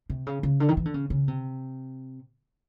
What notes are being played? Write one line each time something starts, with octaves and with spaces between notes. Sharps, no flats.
C3
C#3
C#3
D3
D#3
E3
D3
C#3
C#3
C3